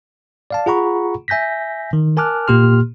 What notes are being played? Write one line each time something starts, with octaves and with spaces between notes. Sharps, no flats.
D5 F5 A5
F4 G#4 F#5 A#5 B5 C#6
E5 G#5 G6 A#6 B6
D#3
A#4 G#5 A5 D6 F6 F#6
A#2 A#3 G4 C6 F6